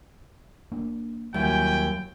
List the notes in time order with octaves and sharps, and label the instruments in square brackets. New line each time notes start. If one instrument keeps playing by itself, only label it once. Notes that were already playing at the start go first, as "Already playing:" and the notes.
[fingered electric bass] A#3 D4
[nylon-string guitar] D#2 [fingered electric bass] F#3 G3 [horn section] E4 F#4 G#5 [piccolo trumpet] G5